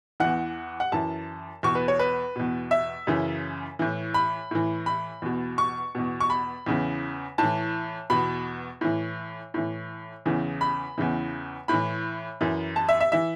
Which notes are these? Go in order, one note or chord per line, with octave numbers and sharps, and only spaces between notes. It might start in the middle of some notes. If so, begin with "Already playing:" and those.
E2 E3 F#5
F#5
F#2 E3 A5
E2 B2 C#6
B4
C#5
B4
E2 B2
E5
F#2 C#3 E3
A2 E3
B5
A2 E3
B5
E2 B2
C#6
E2 B2
C#6
B5
E2 C#3 E3
A2 E3 A5
E2 B2 B5
A2 E3
A2 E3
E2 C#3 E3
B5
E2 C#3 E3
A2 E3 B5
F#2 E3
A5
E5
E5
E3 E5